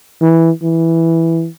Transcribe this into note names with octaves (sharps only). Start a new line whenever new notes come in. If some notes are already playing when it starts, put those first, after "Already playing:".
E3
E3